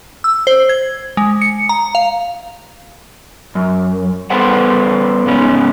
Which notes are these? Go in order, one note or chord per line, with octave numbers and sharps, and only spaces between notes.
E6
C5
G#6
G#3
C#7
A#5
F5
F#2
G3 B3 A4 B4 C5 F#5
G#2 B3 C#4